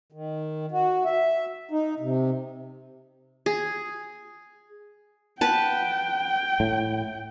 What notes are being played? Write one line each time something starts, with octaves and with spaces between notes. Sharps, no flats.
D#3
F#4
E5
D#4
C3
G#4
B4 F#5 G5 A5
A2